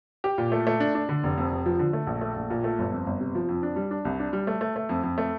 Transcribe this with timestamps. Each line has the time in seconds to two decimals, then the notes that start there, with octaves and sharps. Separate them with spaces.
0.24 G4
0.38 A#2
0.52 A3
0.67 A3
0.80 D4
0.95 D4
1.09 D3
1.23 F1
1.37 F2
1.51 F1
1.66 F3
1.79 D3
1.93 A3
2.07 A#1
2.21 A3
2.36 A#1
2.50 A#2
2.64 A3
2.79 G1
2.92 F2
3.07 G1
3.20 C3
3.35 F3
3.48 F2
3.63 D4
3.76 G3
3.91 D4
4.05 C2
4.20 D4
4.33 G3
4.47 A3
4.61 A3
4.76 A3
4.89 F2
5.03 F2
5.18 A3